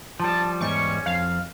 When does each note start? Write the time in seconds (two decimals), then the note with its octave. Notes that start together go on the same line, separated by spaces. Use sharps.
0.20 F3 G3 A5
0.61 E2 G#2 G3 C#4 C#6
1.06 F2 F5